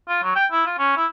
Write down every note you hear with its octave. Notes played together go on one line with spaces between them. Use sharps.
F4
F#3
G5
E4
F4
C#4
E4